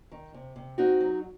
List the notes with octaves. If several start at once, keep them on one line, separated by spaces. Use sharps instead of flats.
D#3
C3
C3
C4 D#4 F#4
F#3